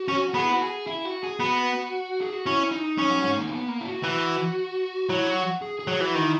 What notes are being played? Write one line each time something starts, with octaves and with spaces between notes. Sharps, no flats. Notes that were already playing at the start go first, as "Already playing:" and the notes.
Already playing: F#4
C#4
F#4
B3 G#4
E4
F#4
G#4
E4
F#4
G#4
B3 F#4
G#4
F#4
C#4 E4
D#4
C#4
F#3
G#3
A#3
B3
A#3
E4
F#4
E3 F#4
F#3 E4
F#4
G#4
G#4
F#3
E3 F#4
D#3 E4